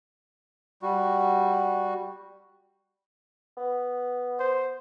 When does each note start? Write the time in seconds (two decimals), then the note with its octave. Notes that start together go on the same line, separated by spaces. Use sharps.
0.82 G3 F#4
3.57 B3
4.39 C5